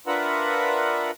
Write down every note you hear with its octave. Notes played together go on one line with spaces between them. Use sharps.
D4 F4 A#4 B4 E5 F#5